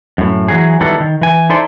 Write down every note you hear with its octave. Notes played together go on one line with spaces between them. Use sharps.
F#2 A2
E3 F#3 G#4
D#3 F#3 G3 B3 E4 A4
D#3
E3 G#5
D#4 E4 A4 C5 D5